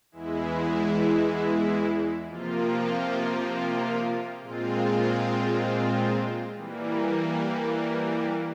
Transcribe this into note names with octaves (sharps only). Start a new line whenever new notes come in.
E2 E3 G#3 E4
C3 F3 A#3 F4
A#2 G#3 C4 F4
E3 G3 A#3